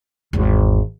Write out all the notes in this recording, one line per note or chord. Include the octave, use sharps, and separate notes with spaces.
G#1 E2